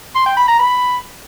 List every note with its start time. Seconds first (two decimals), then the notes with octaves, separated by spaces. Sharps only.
0.15 C6
0.26 G5
0.37 B5
0.48 A#5
0.59 B5